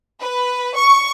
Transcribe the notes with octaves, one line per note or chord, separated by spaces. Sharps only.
B4
C#6